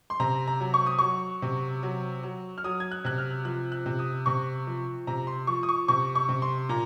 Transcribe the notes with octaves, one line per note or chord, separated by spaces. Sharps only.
C6
C3 A#5
A#5
F#3
C#6
D#6
F#3 C#6
C3
F#3
F#3
F6
F#3 D#6
G#6
F#6
C3 F#6
F6
F3 F#6
F#6
C3
D#6
C3 C#6
F3
C3 A#5
C6
F3 C#6
D#6
C#6
C3 C#6
C#6
C3
C6
A#2 A#5